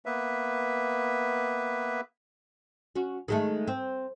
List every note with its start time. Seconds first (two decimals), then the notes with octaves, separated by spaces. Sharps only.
0.06 A#3 B3 B4 E5
2.96 C#4 F#4
3.28 D#3 G#3 A3
3.67 C4